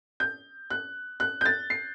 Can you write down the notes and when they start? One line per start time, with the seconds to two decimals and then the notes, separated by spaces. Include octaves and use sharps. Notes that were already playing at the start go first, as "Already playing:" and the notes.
0.20 G6
0.70 F#6
1.20 F#6
1.41 G6
1.46 A6
1.70 C7